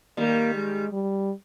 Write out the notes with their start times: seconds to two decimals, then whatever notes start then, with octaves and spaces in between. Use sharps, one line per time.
0.17 D#3 G3 A#3
0.54 G#3
0.92 G3